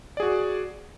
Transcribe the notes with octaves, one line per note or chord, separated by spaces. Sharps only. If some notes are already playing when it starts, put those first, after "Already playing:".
F#4 G#4 D5